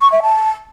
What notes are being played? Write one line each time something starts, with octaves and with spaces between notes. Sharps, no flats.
C#6
E5
A5